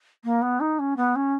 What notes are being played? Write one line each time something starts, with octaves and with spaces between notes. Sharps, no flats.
A#3
B3
D#4
C#4
B3
C#4